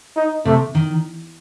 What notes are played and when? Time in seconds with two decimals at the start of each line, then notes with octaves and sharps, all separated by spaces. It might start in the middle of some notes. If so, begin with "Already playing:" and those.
0.16 D#4
0.45 C3 A3
0.75 D#3